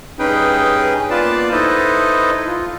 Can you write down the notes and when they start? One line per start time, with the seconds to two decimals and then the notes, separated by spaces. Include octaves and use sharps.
0.19 G2 C#4 D#4 G#4 B4 G5
1.10 A#3 B3 F4 B4 D5 A5
1.51 D#4 E4 A4 B4 C5 D#5
2.47 F4